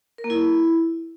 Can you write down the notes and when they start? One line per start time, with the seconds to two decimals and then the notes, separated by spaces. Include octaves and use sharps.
0.18 A#4
0.24 A#3
0.30 E4